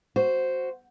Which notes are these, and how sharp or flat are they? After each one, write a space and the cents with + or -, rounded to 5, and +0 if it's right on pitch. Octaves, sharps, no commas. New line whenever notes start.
F#4 +0 C5 +0